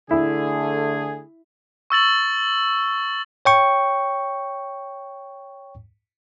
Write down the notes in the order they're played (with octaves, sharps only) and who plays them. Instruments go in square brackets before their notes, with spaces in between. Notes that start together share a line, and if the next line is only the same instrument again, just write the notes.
[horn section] D3 A3 G#4 [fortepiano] E4
[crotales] C#6 E6 A6 F#7
[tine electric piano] C#5 G5 C#6